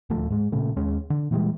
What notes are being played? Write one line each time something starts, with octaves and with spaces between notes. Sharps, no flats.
D#1 D2 F3 A3
G#2 G#3
A#2 C#3 A3
D#2 G#3 C#4
D3
A#2 E3 G3 G#3